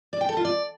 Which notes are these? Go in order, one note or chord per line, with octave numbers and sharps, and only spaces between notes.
D5
G5
A4
F4
D5